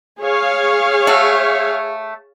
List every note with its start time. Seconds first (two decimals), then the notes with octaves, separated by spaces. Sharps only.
0.21 G#4 C#5 F5
1.07 A3 F#4